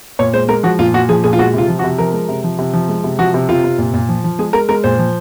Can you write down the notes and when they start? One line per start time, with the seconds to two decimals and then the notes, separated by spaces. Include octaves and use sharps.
0.19 A#2 C#5
0.33 G#3 C5
0.48 G#3 A#4
0.63 F3 F#4
0.79 A#2 F4
0.94 A#2 F#4
1.09 F3 G#4
1.24 A#2 G#4
1.33 F4
1.39 G#3 F#4
1.54 C3 F4
1.68 F3
1.79 F#4
1.84 C3
1.98 F3 A#4
2.13 G#3
2.29 C3
2.44 F3
2.59 C3
2.73 F3
2.89 G#3
3.04 C3
3.19 F3 F#4
3.34 C3
3.49 C3 F4
3.64 C3
3.78 A#2
3.94 A#2
4.09 F3
4.24 F3
4.39 G#3 G#4
4.53 G#3 A#4
4.69 G#3 A#4
4.84 A#2 C5
4.98 F3